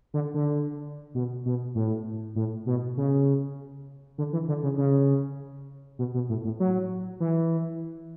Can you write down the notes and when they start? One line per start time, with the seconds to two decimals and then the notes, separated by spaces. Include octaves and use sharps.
0.14 D3
0.34 D3
1.14 B2
1.46 B2
1.75 A2
2.35 A2
2.66 B2
2.97 C#3
4.18 D3
4.33 E3
4.48 D3
4.63 C#3
4.77 C#3
5.99 B2
6.14 B2
6.29 A2
6.45 A2
6.60 F#3
7.20 E3